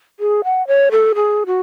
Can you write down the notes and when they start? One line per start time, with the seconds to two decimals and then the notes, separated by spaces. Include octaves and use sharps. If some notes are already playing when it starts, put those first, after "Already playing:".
0.20 G#4
0.44 F#5
0.67 C#5
0.91 A4
1.15 G#4
1.46 F#4